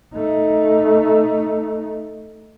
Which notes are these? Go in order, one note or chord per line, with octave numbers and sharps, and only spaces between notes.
A3 D#4